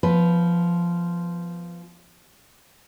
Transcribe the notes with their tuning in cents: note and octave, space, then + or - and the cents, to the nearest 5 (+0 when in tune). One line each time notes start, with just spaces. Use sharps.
F3 -10 B3 +0 B4 +0